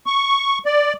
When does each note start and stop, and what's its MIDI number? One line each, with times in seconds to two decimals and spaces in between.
0.06 0.58 85
0.66 0.93 74